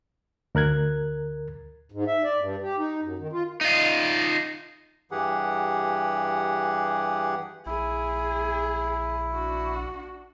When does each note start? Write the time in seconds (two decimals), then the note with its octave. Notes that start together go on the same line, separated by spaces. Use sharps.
0.55 D2 A#4 F#6 G#6
1.92 G#2
2.08 E5
2.24 D5
2.40 G2
2.61 G4
2.78 D#4
3.01 F#2
3.19 D#3
3.32 F4
3.61 D#4 F4
5.11 G2 E3 G4 G#4 F#5
7.66 A#1 E4 G#4
9.35 D4 F#4